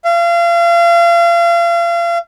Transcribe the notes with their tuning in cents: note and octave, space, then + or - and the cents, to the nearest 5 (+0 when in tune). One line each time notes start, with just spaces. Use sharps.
F5 -35